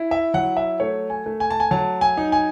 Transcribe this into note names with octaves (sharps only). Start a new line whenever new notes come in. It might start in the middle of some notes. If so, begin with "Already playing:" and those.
Already playing: E4
E5
F#3 F#5
E5
A3 C#5
G#5
A3
G#5
A5
G#5
F#3 A5
G#5
D#4
G#5